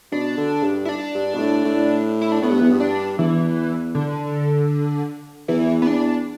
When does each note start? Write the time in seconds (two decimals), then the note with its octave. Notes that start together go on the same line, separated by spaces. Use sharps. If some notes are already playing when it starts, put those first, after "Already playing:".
0.12 B2 D4
0.37 D3
0.63 G2
0.85 E4
0.89 D4
1.15 G2
1.34 B2
1.39 A2
1.65 A2
2.21 E4
2.32 D4
2.43 A2 B3
2.51 G2
2.61 E2
2.70 G2
2.80 D4
3.18 E2 E3
3.95 D3
5.48 E2 E3
5.82 B3
5.87 D4